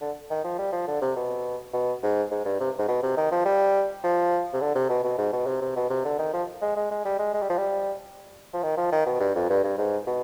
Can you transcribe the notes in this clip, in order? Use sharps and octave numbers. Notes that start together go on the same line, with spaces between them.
D3
D#3
F3
G3
F3
D3
C3
B2
B2
G#2
G#2
G2
C3
G#2
B2
C3
D#3
F3
G3
F3
C3
D3
C3
B2
B2
G#2
B2
C3
C3
B2
C3
D3
D#3
F3
G#3
G#3
G#3
G3
G#3
G#3
G3
F3
G3
F3
D#3
F3
D#3
B2
G2
F2
G2
G2
G#2
B2